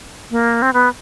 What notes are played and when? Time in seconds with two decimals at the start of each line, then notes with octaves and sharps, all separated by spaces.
0.31 A#3
0.62 C4
0.74 B3